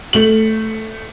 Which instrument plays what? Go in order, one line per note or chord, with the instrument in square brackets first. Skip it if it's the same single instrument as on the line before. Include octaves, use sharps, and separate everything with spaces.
[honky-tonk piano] A3 F#7